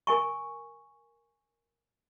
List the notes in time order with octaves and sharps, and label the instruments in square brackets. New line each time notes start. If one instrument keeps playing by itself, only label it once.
[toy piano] A#4 G#5 C#6